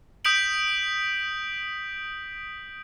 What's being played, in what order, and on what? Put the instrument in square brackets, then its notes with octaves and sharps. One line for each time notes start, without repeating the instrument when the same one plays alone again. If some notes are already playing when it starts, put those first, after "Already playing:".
[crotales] D#6 G6 B6 D7 F#7